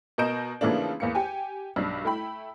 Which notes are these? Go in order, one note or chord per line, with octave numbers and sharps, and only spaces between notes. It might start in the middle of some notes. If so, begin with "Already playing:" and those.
B2 A#4 D#5 G6 D7 E7
C#3 E3 F3 A3 A#3 D4
E2 A#3 C#7
G4 G5 G#5
B1 G2 D4
A3 E4 G5 B5